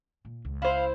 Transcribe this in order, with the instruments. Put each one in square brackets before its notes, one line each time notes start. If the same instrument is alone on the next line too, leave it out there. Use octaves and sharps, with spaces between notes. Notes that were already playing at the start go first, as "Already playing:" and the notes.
[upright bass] A#2
C#2
[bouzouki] E4 C5 [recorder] F5